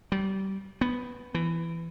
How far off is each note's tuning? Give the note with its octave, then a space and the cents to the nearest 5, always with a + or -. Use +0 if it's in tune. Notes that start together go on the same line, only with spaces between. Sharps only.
G3 -25
B3 +0
E3 +15